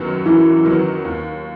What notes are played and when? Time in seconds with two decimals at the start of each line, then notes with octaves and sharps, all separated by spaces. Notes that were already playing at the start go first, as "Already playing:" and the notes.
Already playing: F#2 D#3 F#3 B3
0.25 F#2 E3
0.65 D#3 F#3 B3
1.05 D#2